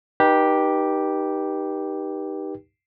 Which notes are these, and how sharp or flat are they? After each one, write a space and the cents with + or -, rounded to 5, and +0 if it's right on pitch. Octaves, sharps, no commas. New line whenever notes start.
D#4 -10 G4 +0 B4 -35